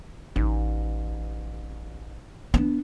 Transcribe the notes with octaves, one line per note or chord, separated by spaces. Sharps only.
A1 D#4
B3 D4